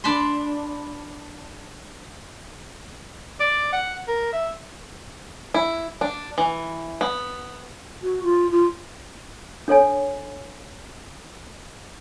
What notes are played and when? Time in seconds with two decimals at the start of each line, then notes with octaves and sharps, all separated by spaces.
0.04 D4 A5 B5 C6
3.40 D5
3.72 F#5
4.07 A#4
4.32 E5
5.54 E4
6.01 D4
6.38 E3
7.01 B3
8.03 F#4
8.23 F4
8.51 F4
9.68 D4 A4 C#5 G#5